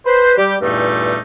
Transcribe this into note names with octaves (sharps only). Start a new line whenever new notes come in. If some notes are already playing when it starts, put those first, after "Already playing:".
B4 C5
G3 G4
E2 G2 A#2 G3 A3 D#4